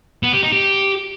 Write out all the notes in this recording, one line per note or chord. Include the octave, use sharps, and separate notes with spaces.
B3
G4
D#4
G4